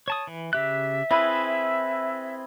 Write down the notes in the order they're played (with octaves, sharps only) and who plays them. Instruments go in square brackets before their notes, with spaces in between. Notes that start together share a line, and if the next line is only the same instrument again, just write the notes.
[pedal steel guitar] C#5 A5 D#6
E3
[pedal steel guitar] C#3 G4 F#6 [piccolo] E5
[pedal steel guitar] C4 G#4 B4 [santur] E4